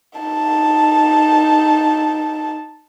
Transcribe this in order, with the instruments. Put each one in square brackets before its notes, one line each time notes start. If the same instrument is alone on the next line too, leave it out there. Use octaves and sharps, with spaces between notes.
[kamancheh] D#4 A5